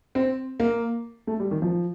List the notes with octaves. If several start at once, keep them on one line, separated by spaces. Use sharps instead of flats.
C4
A#3
A3
G3
D#3
F3